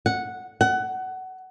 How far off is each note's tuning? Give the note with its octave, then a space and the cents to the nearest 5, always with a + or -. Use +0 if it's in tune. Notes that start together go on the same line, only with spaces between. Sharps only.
F#5 -10
F#5 +20